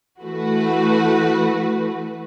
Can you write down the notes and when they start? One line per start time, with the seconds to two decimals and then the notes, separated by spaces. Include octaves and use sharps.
0.20 E3 A3 F#4 B4